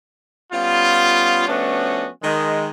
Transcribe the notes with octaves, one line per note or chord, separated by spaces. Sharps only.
G3 B3 C#4 F4
F3 A3 B3 C#4 D4 F#4
D#3 G#3